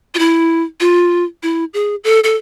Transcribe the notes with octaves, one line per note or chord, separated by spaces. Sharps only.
F4
E4
F4
E4
G#4
A4
A4